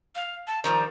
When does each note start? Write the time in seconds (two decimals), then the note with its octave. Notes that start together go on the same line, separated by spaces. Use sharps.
0.15 F5
0.47 A5
0.64 D#3 F3 G3 A#5